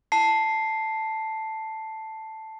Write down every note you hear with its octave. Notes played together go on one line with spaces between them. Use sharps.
A5 C7